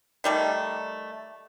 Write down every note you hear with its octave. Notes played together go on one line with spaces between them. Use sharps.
D#3 G3 A3